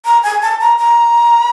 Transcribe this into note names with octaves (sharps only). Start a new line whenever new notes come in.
A#5
G#5
A5
A#5
A#5